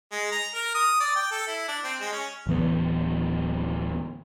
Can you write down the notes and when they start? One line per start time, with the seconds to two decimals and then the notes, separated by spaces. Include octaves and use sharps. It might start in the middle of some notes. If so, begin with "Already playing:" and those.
0.12 G#3
0.32 A#5
0.55 A#4
0.74 D#6
1.00 D5
1.15 G5
1.31 A4
1.47 E4
1.68 D4
1.84 C4
2.01 G#3
2.12 C#4
2.47 D1 E3 B3